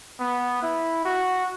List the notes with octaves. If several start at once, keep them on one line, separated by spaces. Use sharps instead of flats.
B3
E4
F#4